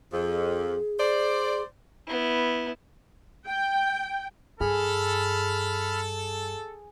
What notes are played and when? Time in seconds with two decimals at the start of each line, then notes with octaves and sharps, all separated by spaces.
0.12 F2 G#4
0.99 C5 D5
2.08 B3 E4
3.46 G5
4.60 G2 G#4 A4 B5 F6